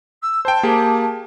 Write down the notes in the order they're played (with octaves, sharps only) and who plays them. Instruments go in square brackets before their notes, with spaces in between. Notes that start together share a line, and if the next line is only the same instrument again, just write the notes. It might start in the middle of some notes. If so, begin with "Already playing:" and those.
[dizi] E6
[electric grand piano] C5 G5 [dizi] A5
[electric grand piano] A#3 G4 G#4